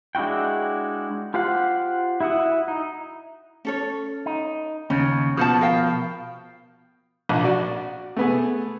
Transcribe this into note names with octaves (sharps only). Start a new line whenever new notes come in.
G#3 D4 E4 F#4 G5
F4 G4 C5 F5 F#5
E4 F#4 E5 F#5 D#6
D#4
C#4 A4 C#5
D#4
D#2 C#3 C#4
B2 F3 B4 F#5 A5
A#4 F5 G5
A#1
F#4 D5
A3 B3 G#4